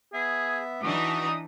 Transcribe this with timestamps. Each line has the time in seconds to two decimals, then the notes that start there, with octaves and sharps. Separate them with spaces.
0.13 B3 G#4 E5
0.83 E3 D4 D#4 F#4 D#6